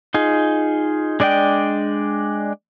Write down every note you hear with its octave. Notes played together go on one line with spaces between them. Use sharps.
D#4 F4 G#4
G#3 D4 D5 D#5 G5